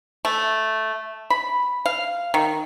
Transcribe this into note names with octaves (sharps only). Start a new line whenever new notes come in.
A3
B5
F5
D#3